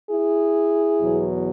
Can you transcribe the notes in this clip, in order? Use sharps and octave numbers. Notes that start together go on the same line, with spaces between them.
E4 G#4
E2 B2 F#3